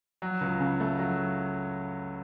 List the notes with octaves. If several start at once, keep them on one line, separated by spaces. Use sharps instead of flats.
F#3
C#2
C#3
A3
F#3